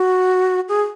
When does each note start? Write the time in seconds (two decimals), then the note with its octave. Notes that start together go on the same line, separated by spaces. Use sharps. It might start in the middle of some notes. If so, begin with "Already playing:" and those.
Already playing: F#4
0.69 G#4